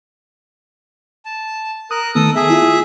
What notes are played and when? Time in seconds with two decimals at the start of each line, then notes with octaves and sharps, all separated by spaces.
1.25 A5
1.91 A#4 D#6 F#6
2.15 D#3 A3 B3 A4 D#6
2.36 G#4 E5 A5
2.50 E4 F4